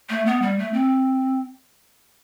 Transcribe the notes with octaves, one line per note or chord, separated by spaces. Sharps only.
A3
B3
G3
A3
C4